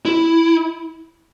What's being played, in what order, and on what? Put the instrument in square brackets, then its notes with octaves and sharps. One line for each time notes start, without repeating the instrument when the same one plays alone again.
[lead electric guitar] E4